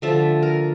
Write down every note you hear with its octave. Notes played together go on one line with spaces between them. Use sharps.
D3 F3 A3 E5
A#4